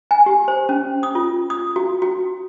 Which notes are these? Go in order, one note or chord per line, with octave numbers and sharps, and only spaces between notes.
G#5
G4
C5
C#4
D#6
F4
D#6
F#4
F#4